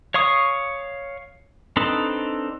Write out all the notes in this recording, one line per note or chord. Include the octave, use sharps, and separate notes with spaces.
C#5 F5 C#6 D#6
C4 D4 D#4 A4 B4